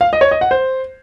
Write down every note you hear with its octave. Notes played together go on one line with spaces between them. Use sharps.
F5
D#5
C#5
D#5
F#5
C5